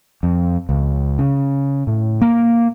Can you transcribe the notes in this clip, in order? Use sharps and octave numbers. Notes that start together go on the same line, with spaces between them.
F2
C#2
C#3
A2
A#3